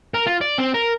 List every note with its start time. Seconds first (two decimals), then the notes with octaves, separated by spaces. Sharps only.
0.14 A#4
0.27 F4
0.41 D5
0.58 C4
0.74 A#4